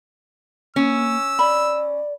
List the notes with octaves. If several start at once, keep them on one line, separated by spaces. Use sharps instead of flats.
A#3 C#4 E6
D5 B5